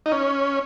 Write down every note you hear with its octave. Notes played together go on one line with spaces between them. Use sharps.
D#4
C#4